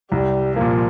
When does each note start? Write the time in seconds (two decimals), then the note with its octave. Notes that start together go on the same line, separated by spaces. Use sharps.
0.12 C2 G3
0.56 A#2 F3 A#3